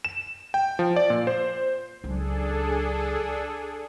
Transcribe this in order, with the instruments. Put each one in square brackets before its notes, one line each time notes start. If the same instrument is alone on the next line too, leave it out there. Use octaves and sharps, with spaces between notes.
[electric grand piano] E7
G5
F3
D5
A#2
C5
[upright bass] C#2 F#3 [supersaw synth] D4 G#4 A4